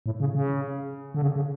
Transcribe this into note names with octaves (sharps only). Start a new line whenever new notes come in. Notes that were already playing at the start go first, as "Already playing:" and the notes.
A2
C#3
C#3
D3
C#3
C#3